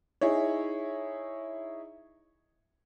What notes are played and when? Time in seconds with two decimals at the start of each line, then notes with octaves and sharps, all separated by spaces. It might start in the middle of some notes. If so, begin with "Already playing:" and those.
0.21 D#4 E4 G#4 C#5